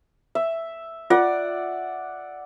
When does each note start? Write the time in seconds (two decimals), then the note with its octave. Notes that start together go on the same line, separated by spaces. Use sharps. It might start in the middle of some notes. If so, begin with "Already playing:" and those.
0.35 E5
1.10 F4 D5 F#5